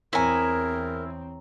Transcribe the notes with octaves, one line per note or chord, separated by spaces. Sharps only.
E2 C4 E4 A#4 C#5 G#5 A#5 D#6